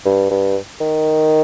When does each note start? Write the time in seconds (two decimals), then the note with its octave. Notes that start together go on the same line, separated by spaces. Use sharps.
0.06 G2
0.31 G2
0.81 D#3